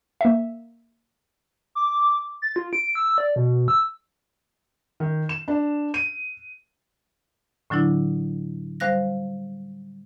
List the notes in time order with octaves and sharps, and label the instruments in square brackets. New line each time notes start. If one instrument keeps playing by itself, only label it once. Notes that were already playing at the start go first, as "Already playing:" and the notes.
[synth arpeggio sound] A#3 E5
[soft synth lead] D6
A6
F4
D7
E6
D5
B2
E6
[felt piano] D#3
E7
D4
D#7
[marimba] A2 D3 F#3 D4 E4
G3 C5 F5 F#6 A#6